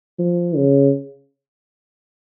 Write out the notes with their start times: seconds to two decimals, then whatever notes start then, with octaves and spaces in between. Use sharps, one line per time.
0.19 F3
0.56 C#3